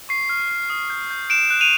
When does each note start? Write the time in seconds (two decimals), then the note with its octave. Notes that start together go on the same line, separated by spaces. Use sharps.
0.09 C#6 C7
0.29 F6
0.49 F6
0.70 D#6
0.90 G6
1.11 G6
1.30 F#6 D7 E7
1.50 F#6
1.61 D#7 F7